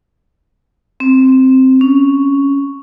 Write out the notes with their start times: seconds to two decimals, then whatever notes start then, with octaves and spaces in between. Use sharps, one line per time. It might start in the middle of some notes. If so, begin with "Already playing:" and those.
1.00 C4
1.81 C#4